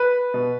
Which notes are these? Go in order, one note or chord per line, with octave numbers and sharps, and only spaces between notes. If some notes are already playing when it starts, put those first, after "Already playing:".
Already playing: B4
B2